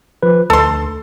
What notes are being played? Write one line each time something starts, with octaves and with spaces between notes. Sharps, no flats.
F3 B4
D2 A4 C6